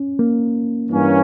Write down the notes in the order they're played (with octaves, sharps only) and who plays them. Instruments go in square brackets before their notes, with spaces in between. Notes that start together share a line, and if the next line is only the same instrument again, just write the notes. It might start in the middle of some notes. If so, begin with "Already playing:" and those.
Already playing: [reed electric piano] C#4
A#3
[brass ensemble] G2 E3 A#3 C#4